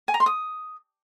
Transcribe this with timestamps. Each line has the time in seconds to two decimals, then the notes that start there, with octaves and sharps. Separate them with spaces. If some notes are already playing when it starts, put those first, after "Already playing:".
0.08 G#5
0.14 A#5
0.20 C6
0.26 D#6